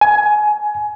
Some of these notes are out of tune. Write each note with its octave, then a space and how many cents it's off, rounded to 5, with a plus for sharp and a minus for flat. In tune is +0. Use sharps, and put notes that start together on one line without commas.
G#5 +20